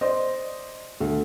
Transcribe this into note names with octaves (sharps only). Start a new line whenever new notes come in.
C5 D5 D#5
D2